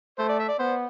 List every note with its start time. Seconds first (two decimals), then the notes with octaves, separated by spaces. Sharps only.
0.18 A3 C5
0.29 D5
0.39 E5
0.48 D5
0.59 B3 C5